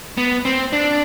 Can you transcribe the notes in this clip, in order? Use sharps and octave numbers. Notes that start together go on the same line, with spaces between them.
B3
C4
D4